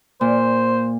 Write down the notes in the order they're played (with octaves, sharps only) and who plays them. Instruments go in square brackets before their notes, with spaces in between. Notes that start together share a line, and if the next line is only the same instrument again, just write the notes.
[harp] A#2 [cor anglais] C5